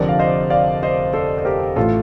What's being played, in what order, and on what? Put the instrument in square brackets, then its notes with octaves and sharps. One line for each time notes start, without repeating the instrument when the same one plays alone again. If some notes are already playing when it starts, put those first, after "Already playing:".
Already playing: [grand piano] F1 F2 D3 A#4 D5
F5
C5 D#5
D5 F5
C5 D#5
A4 C5
C5
G4 A#4
A1 A2 F4 A4